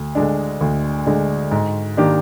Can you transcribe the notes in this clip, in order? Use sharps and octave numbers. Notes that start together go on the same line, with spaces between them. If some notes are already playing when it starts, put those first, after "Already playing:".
Already playing: D2
D3 G#3 D4
D2
D3 G#3 D4
G#2
D#3 A#3 D4 G4